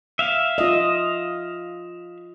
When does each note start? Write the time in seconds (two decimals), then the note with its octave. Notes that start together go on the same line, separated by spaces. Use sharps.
0.19 E5 F5
0.58 F4 D#5